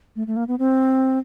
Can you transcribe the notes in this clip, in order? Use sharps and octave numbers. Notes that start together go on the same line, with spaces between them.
A3
A3
A#3
B3
C4